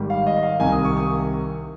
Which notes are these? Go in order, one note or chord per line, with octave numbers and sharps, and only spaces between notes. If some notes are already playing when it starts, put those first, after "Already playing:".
Already playing: G#1 G#2 D#3 G3
F5
D#5
F5
C2 C3 D#3 G#5
D#6
C#6
D#6